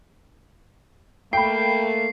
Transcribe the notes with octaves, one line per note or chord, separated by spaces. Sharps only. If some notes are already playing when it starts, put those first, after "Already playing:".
A3 A#3 G5 B5 C7